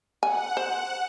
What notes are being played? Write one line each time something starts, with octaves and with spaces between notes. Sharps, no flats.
F#5 G#5
C5